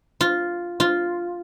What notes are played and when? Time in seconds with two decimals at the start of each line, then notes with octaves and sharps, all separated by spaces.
0.21 F4
0.80 F4